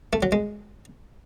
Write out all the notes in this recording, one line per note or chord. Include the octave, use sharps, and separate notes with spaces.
A3
F#3
G#3